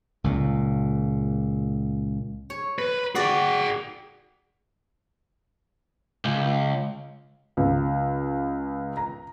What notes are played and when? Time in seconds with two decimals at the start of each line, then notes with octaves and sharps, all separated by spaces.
0.24 C#2 A#2
2.50 C#5
2.78 B4
3.15 F#4 G#4 D5 G5
6.25 C#2
7.57 C#2
8.97 A#5